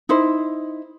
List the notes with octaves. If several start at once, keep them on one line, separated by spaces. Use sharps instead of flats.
D#4 E4 C5